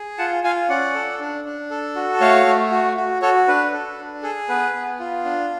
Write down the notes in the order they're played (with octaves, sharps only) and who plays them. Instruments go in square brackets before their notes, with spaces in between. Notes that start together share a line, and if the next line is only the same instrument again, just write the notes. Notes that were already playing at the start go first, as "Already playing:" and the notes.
Already playing: [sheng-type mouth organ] G#4
F4 F#5 A5
F4 F5 G#5
C#4 D5 F#5
A4
D4
D4
A4
F#4
A3 C#5 F5
A3
F#4
F#4
F#4 A4 C#5
D4 B4
A4
D4
G#4 A4
B3 B4
B3
F4
D4